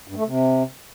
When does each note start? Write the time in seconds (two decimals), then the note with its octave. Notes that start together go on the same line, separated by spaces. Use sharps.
0.08 G2
0.16 A3
0.24 C3